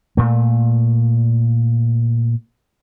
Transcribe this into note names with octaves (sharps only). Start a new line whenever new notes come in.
A#2 A3